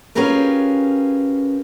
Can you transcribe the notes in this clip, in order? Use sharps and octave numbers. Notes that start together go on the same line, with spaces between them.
C#4 F4 G4 G#4 A#4 B4